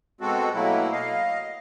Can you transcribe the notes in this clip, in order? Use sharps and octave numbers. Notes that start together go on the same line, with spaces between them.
B2 G#3 C4 F#4 A4
B2 F#3 A3 A#3 E4
D#5 F5